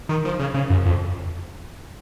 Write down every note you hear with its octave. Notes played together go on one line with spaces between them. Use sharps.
D#3
F3
C#3
C#3
F#2
F2